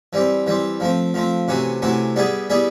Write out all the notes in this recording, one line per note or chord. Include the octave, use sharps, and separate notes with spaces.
E3 G3 C4
E3 G3 C4
F3 A3 C4
F3 A3 C4
C3 E3 A3 C#4 F#4
C3 E3 A3 C#4 F#4
G3 B3 E4 G#4
G3 B3 E4 G#4